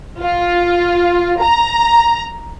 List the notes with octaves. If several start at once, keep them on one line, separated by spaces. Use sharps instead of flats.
F4
A#5